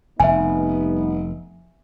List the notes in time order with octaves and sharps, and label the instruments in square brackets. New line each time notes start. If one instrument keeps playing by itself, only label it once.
[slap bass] F1 [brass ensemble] G3 B3 D#4 [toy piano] E5 G#5